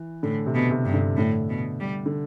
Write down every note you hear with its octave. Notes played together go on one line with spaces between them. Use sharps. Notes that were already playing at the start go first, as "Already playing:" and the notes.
Already playing: E3
A2 D3
C3
B2
C3
G2
D3
A2 D3
B2
G3
D3